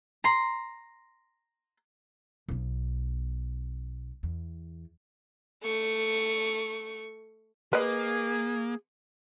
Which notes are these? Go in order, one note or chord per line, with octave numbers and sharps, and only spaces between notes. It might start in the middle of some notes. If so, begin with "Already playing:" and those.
A#5 C6
B1 B3
E2
A3 C#6
A#3 G#4 B4 D#5